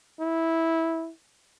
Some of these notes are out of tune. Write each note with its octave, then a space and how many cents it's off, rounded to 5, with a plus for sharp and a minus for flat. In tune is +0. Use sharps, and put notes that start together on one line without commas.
E4 -10